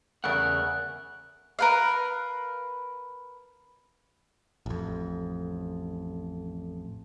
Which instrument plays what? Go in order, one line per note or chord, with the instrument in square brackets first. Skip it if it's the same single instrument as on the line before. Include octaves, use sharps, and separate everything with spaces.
[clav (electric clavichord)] E2 C#3 A3 [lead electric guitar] A#4 F#5 [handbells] F#6
[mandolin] A#4 B4 F5
[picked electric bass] A1 F2